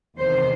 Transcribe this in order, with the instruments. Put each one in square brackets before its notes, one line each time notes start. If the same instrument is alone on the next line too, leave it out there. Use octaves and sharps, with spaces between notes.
[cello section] E2 C3 D#3 C5